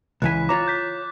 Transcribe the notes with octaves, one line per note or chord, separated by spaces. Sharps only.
C#2 E3 G#5 F#6 B6
F4 C#5 A#5 D6 A6
G6 B6